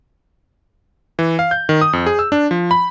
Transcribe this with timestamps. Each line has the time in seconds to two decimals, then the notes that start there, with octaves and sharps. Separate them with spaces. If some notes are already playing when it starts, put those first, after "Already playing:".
1.19 E3
1.39 F5
1.51 G6
1.69 D#3
1.81 D#6
1.93 F2
2.06 G#4
2.19 E6
2.32 D4
2.51 F3
2.71 B5